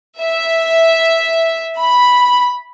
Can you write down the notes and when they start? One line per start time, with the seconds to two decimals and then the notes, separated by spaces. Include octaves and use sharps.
0.17 E5
1.81 B5